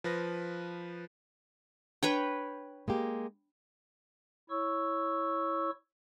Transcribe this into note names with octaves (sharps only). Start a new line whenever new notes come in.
F3 B4 A#6
D4 B4 C#5 G5
G#3 A#3 G4
E4 C#5 C#6 E6